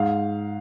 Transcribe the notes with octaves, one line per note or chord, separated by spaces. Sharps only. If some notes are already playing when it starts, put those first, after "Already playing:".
Already playing: G#2 F5